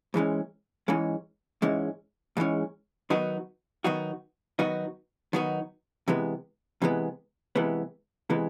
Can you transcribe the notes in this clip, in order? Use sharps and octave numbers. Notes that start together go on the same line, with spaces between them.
G#2 E3 G#3 C#4
G#2 E3 G#3 C#4
G#2 E3 G#3 C#4
G#2 E3 G#3 C#4
D#3 F#3 B3 D#4 F#4
D#3 F#3 B3 D#4 F#4
D#3 F#3 B3 D#4 F#4
D#3 F#3 B3 D#4 F#4
C3 E3 G#3 B3
C3 E3 G#3 B3
C3 E3 G#3 B3
C3 E3 G#3 B3